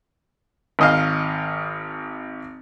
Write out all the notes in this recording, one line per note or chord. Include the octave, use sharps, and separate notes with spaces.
G#1 D#5 F5